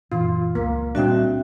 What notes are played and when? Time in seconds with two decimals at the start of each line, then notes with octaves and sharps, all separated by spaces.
0.12 F#2 A#2 E3 F4
0.55 C#2 A#3
0.95 A#2 G3 C4 D4 F#4 E5 G5